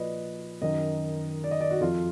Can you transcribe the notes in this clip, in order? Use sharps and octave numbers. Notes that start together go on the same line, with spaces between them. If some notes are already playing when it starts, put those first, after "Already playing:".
Already playing: A#2 F3 B4 D5 D#5
F#2 D#3 D#5
D5
D#5
D5
F#4
F2 F3 F4